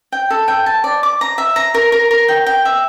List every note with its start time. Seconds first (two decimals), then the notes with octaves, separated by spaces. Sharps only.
0.12 G5
0.30 A4
0.48 G5
0.66 A5
0.84 D5
1.03 D6
1.21 A#5
1.38 E5
1.56 A#5
1.75 A#4
1.92 A#4
2.11 A#4
2.28 G5
2.46 G5
2.65 E5